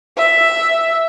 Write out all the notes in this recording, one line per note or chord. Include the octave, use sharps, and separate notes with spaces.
E5